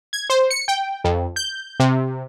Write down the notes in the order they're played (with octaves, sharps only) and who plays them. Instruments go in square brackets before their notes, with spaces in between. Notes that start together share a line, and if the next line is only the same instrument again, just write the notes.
[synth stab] G#6
C5
C#7
G5
F2
G6
C3